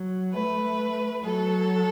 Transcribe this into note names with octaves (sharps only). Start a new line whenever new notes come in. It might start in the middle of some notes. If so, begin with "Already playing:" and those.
Already playing: F#3
A3 B4
F#3 A4